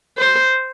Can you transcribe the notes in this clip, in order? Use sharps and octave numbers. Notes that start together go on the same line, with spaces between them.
C5